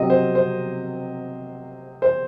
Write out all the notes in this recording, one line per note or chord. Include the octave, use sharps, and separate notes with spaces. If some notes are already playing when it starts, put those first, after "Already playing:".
Already playing: C3 F#3 C4 D#5
C5
C5
C5